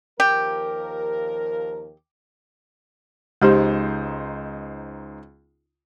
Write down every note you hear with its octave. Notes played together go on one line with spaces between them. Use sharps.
D#2 F3 G4 A#4
C#2 G#3 D#4 G4 C5